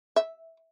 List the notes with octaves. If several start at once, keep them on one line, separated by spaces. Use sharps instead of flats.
E5